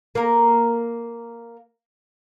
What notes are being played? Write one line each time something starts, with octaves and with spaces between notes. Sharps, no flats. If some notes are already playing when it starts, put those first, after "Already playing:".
A#3 A#4